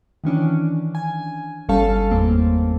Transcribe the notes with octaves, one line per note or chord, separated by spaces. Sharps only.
D#3 E3 C#4 D4
G#5
G1 G3 C#4 A4 F5 A5
E2 A2 A#3 C4